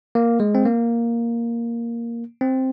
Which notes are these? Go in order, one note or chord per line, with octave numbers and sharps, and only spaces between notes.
A#3
G#3
C4
A#3
C4